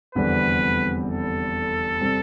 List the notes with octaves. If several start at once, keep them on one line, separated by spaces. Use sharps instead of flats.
F1 E2 D3 G3 C4 B4
A4
C3 G3 C4